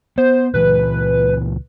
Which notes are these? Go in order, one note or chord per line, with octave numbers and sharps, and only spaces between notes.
B3 C5
C#2 A#2 E3 B4